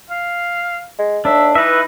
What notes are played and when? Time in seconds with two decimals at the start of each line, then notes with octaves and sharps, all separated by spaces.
0.10 F5
0.99 G#3
1.25 D#2 D4 E5
1.55 E3 D#4 B4 E5